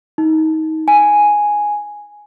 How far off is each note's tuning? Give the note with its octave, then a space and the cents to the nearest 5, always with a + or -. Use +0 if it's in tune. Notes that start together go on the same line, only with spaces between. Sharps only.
D#4 +25
G#5 +0